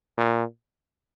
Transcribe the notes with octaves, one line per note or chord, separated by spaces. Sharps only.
A#2